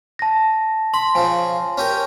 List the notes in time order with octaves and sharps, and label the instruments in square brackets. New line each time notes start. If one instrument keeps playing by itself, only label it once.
[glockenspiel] A5 A#6
[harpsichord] B5 [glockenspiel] C6
[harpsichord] C#3 F3 [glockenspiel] G#5
[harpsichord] C#4 G4 A#4